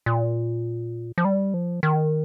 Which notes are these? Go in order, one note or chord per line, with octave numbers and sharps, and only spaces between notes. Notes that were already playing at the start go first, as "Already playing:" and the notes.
A#2
F3
G3
F3
D#3